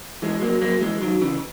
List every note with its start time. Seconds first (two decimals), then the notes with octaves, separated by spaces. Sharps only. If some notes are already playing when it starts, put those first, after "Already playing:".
0.22 E3 G#3
0.42 F#3 A#3
0.61 F#3 A#3
0.81 E3 G#3
1.02 D#3 F#3
1.21 C#3 E3